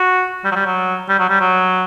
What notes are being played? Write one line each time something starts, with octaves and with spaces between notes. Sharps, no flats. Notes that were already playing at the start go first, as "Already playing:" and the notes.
Already playing: F#4
G3
F#3
G3
F#3
G3
F#3
G3
F#3